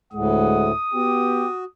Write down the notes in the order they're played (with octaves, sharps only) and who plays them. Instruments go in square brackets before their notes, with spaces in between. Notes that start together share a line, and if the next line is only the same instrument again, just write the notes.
[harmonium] D2 A2 [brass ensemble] G#3 F#5 [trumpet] D#6
[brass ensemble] B3 G4 [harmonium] F#4